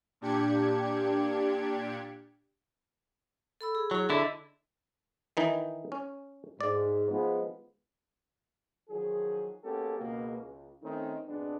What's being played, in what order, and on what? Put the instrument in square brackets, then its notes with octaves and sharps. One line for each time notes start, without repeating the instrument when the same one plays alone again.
[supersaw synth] A#2 D4 G4 G#6 C#7
[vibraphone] A4 B5 E6
G#4
[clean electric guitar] F#3 [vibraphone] E4 G#4
[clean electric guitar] D3 E4 [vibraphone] D#5
[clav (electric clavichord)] D#3 E3 D#4
C#4
[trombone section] G#2 [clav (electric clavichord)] D5
[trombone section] F3 G#3 B3
D#3 F3 F#3 G#4
G#3 A#3 B3 C#4 G4 A4
C#2 B2 A#3
C#2
D#3 A3 C4 C#4 D#4
G#1 F2 G#3 B3 D4